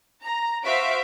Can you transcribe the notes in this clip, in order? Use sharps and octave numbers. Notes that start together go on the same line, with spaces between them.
A#5
F#4 C5 E5 F5 B6 D7